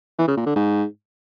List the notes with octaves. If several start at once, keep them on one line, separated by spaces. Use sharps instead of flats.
E3
C#3
A#2
D3
G#2